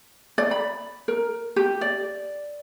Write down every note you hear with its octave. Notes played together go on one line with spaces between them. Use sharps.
D5
B5
A#4
G4
D5